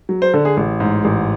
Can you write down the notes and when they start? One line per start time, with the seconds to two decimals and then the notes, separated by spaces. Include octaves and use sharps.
0.09 F#3
0.22 C5
0.33 D3 A4
0.45 G#4
0.57 A1
0.80 G#2
1.04 A1